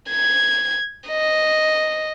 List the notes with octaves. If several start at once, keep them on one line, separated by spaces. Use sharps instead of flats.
G#6
D#5